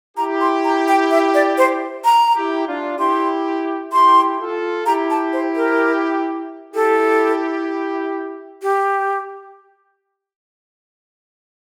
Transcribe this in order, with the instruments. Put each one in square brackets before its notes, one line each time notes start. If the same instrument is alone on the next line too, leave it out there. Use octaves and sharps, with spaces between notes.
[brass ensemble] E4 G4 [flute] A#5
[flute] C6
A#5
G5
E5
D5
C5
A#5
[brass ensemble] E4 G4
D4 F4
[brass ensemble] E4 G4 [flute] C6
[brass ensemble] E4 G4 [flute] C6
[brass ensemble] F4 A4
[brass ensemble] E4 G4 [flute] A#5
[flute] A5
C5
A#4
[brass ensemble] E4 G4 [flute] A4
[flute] G4